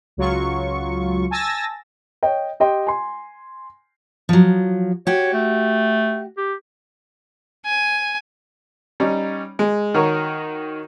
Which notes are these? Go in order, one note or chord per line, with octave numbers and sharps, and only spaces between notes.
C#2 F#3 F4 C#6
G#5 A5 E6 A6 A#6
C#5 D#5 G5
G4 D#5 G5 C6
G#5 C6
F3 F#3
F#4 G4 C#5
A3
G4
G#5
G3 C#4 D#4
G#3
D#3 F#4 A#4 C#5